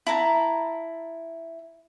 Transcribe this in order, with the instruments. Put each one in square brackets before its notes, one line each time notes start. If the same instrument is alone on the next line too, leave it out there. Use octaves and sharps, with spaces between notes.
[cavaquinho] E4 A5 A#5